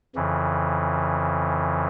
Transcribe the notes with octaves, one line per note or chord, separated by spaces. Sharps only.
F2 C#3 E3